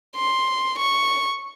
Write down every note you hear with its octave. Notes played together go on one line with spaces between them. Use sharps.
C6
C#6